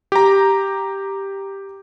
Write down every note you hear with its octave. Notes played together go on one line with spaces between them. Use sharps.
G4 A#5